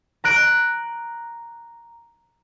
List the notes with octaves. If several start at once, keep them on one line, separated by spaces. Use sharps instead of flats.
A#5 F#6 D7